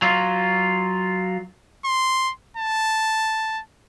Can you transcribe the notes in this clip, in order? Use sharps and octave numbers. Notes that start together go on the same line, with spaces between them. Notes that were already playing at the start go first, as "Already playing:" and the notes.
F#3 F4
C6
A5